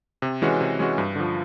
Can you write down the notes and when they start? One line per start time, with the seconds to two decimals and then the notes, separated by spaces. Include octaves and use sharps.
0.22 C3
0.42 E3 G#3 C#4 F#4
0.61 C3
0.79 E3 G#3 C#4 F#4
0.98 G2
1.16 D3 F3